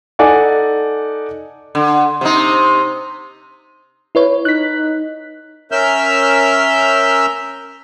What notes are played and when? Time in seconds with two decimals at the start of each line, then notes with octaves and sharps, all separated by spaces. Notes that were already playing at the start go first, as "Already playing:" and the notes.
0.19 D#4 A4 D5 F#5 G#5 D6
1.75 D3
2.21 C3 D#4
4.15 E4 B4 C#5
4.45 D#4 F#6 B6
5.72 C#4 A#4 E5 E6 F6 G6